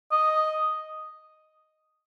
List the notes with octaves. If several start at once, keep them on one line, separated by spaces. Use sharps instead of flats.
D#5